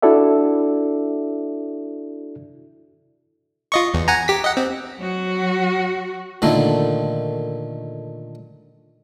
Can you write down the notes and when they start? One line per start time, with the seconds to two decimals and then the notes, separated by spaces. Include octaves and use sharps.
0.02 D4 E4 F#4 A4 D5 E5
3.72 F4 D#5 C#6
3.94 E2
4.08 F#5 G#5 A#5
4.28 G4 B6
4.44 D#5 F#5
4.57 C4
4.99 F#3 F#4
6.42 A#2 D3 D#3 A3